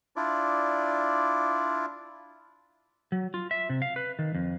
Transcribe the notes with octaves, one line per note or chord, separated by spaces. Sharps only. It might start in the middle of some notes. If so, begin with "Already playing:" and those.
D4 E4 F4 D5
F#3
F4
E5
C3
F5
B4
D#3
F2